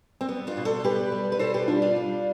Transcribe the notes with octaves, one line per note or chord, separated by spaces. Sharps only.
C4
G3 B3
D4 F4
B2
A4 C5
G3 G4 B4
G3
B4
B2 A4 C5
G4 B4
G3 D4 F4
D4 F4
G3